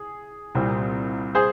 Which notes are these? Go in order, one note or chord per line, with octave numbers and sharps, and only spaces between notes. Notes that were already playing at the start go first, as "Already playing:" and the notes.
Already playing: G#4
C2 A#2 G3 C4
G#4 C5